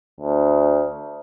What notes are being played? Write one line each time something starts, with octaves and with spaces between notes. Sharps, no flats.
D2